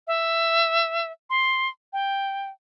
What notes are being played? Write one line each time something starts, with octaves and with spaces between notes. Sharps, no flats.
E5
C6
G5